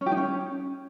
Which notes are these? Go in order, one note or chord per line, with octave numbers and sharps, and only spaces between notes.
C#4
G4
D#4
C#4